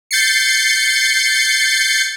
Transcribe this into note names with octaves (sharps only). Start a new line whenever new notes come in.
G6 A6 C7 C#7